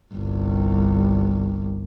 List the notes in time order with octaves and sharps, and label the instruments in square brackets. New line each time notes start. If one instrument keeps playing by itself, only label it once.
[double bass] G1 C2